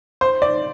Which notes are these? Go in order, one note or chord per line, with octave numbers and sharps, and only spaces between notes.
C5
D5